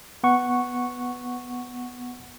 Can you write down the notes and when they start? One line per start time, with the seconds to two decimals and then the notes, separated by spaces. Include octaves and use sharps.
0.23 B3 F#5 C#6